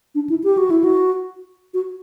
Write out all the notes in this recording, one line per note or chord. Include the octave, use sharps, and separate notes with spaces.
D4
E4
G4
F#4
E4
F#4
F#4